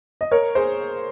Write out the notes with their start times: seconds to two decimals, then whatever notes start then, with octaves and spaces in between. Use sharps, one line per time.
0.21 D#5
0.31 A#4 C#5
0.55 G#4 C5